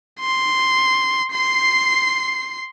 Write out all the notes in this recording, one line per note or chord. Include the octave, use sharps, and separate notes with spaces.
C6
C6 C7